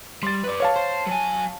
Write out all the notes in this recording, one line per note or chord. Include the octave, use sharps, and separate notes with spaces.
G3 C6 A6
B4 D5
C#5 F5 A5
C5
F#3 G#5